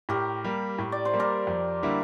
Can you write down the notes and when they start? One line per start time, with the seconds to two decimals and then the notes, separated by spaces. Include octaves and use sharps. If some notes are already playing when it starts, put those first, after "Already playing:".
0.09 A2 G4 A#4
0.44 G3 A#3
0.79 A2
0.92 D5
1.05 C5
1.13 G3 A#3
1.20 A#4 D5
1.47 F2
1.83 D3 G3 A#3 E4